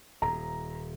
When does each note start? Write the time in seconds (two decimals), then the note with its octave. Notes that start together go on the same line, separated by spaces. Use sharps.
0.22 D#1 A#5